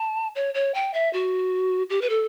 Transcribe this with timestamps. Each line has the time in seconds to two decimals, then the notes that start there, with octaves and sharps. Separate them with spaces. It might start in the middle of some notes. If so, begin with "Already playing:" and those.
Already playing: A5
0.35 C#5
0.54 C#5
0.74 G5
0.94 E5
1.13 F#4
1.90 G4
2.02 B4
2.10 A4